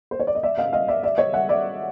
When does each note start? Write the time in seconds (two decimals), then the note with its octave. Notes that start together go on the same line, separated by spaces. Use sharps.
0.11 C5
0.20 C#5
0.27 D5
0.35 D#5
0.43 D5 E5
0.58 D#5 F5
0.73 D#5 F5
0.88 D5 E5
1.03 D5 E5
1.18 C#5 D#5
1.33 E5 F#5
1.49 D5 E5